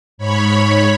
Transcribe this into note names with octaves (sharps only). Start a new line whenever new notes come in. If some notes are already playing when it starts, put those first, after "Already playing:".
G#2 C#5 B5